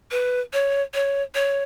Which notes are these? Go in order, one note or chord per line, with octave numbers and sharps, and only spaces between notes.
B4
C#5
C#5
C#5